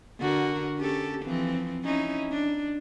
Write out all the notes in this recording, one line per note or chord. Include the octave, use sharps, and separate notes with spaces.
D3 F#4 A#4
C#4 G4 A4
E3 F3 C4
C#4 D#4 E4
D4